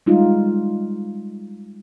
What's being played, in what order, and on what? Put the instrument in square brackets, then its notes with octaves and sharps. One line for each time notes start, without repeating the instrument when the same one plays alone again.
[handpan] G3 G#3 D#4 F4